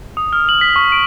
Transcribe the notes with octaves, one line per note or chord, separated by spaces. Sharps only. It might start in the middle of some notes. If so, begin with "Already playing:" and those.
D#6
F6
F#7
B6
C#6
D7